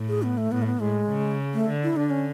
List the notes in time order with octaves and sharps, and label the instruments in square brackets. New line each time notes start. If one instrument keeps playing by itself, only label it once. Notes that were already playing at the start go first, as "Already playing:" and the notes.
Already playing: [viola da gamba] A2
[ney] G#4
B3
A3
[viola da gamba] A2 [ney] B3
[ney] A3
B3
[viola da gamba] A2 [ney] G#3
[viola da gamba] C#3
[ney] A3
[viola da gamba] D3
[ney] E4
[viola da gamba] D3 [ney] D4
[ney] C#4